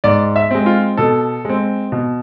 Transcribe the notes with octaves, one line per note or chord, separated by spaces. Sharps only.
G#2 D5
E5
G#3 C4
F4
B2 A4
G#3 C4
B2